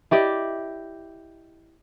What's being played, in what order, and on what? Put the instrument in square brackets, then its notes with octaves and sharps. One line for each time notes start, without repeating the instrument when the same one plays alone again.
[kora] E4 G4 D5 D#5